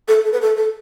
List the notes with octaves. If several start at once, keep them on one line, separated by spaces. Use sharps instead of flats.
A4
A4
B4
A4
A4